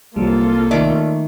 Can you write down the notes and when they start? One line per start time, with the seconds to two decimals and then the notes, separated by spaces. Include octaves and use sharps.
0.16 C2 F#3 G3 A#3 F4 A4
0.71 D#3 A3 D5 D6